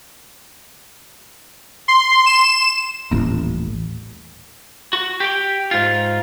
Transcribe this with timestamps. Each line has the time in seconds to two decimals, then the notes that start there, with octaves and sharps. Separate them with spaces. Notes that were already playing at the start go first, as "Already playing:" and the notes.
1.88 C6
2.26 E7
3.11 D#1 A1
4.93 F#4
5.20 G4 G5
5.71 G#2 F4